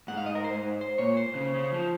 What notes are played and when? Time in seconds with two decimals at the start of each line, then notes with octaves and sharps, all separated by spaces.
0.08 G#2 F#5
0.17 F5
0.26 D#5
0.35 A#4
0.44 C5
0.81 C5
0.98 A#2 C#5
1.17 C5
1.35 C#3
1.54 C#3
1.71 F3